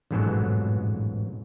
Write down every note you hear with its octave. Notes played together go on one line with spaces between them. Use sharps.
A1 F2 G#2 B2 F#3 A4